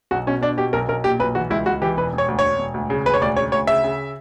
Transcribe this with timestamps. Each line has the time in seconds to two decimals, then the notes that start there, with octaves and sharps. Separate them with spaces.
0.11 B1 F#4
0.27 B2 C#4
0.42 B2 D4
0.57 B2 G4
0.73 B1 A#4
0.89 B1 A#4
1.04 A#2 G4
1.20 B1 B4
1.35 E3 F#4
1.50 C#2 E4
1.66 C#2 F#4
1.82 E3 G4
1.97 E1 B4
2.13 E1
2.18 C#5
2.28 D2
2.39 E1 C#5
2.59 E1
2.74 D2
2.90 C#3
3.05 E1 B4
3.14 C#5
3.21 D2 D5
3.36 C#3 C#5
3.52 D2 C#5
3.67 C#3 E5
3.84 C#3